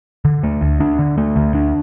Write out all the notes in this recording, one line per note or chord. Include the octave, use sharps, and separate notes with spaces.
D3
A3
D2
D4
D3
A3
D2
D4